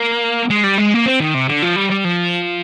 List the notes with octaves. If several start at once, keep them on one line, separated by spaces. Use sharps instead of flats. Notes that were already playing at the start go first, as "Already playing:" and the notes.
Already playing: A#3
G#3
G3
G#3
A#3
C4
D#3
C3
D3
F3
G3
G3
F3